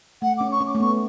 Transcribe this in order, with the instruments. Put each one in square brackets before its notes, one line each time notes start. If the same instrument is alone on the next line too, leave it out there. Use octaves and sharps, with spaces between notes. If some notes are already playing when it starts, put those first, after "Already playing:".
[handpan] A3 [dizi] F#5
[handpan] C#4 [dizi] D6
[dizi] C#6
[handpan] C#4
[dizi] D6
[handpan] A3
[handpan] B3 [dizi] C#6